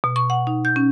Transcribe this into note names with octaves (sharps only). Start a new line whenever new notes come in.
B2
C#6
F#5
D#4
G6
C#4